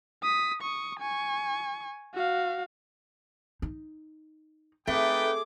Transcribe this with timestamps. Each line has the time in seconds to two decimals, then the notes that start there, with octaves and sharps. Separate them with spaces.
0.23 D#6 B6
0.62 C#6 D#6
0.99 G#5 C#6
2.14 F#4 F5
3.62 D#4
4.87 A3 C4 D#4 G#4 B4 G5 D6